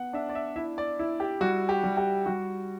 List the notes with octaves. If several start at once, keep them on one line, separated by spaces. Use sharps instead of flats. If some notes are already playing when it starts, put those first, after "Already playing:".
Already playing: B3 F#5
D4 E5
D5
E5
E4 E5
D5
E4
G4
G3 F#4
G4
G3
G4
G3 F#4